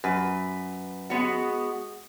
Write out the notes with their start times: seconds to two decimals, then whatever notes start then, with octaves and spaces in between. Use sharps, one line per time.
0.04 F#2 B4
1.10 G#3 B3 F#4